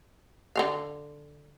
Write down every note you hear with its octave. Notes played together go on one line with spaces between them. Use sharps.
D3 D#3 F5